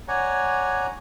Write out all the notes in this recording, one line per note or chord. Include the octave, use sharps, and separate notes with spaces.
C#5 D5 F#5 G#5 A#5